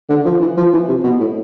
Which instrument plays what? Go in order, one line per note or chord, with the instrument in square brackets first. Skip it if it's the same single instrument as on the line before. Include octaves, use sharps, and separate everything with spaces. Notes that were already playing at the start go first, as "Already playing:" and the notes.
[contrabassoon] D3
F3
E3
F3
E3
C3
B2
A2